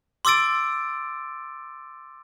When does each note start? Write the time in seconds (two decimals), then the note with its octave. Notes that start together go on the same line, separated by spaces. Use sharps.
0.25 C6 D6 E6 A6 D7